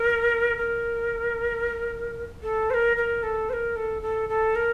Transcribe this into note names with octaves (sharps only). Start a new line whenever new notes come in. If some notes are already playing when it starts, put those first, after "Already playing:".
Already playing: A#4
A#4
A4
C5
A#4
A#4
A4
C5
A#4
A4
A4
A4
A#4